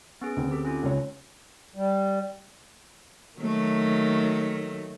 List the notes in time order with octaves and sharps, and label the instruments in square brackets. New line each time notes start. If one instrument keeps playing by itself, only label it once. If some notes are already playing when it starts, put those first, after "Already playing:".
[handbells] B3 C#4 G#4
[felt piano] D2 C4
[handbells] G4 A4
C#4 D#4 F4
[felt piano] C#2 C#5
[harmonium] G3
[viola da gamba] D#3 F#3 A3